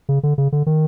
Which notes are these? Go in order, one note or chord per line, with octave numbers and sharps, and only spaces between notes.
C#3
D3
C#3
D3
D#3